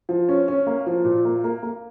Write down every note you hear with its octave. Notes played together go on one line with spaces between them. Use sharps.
F3
C#4
C#4
A#3
F3
A#2
A#3
A#3
A#3